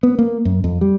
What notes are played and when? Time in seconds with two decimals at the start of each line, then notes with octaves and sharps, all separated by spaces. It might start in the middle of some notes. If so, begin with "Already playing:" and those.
0.03 B3
0.19 A#3
0.45 F#2
0.64 F2
0.81 G3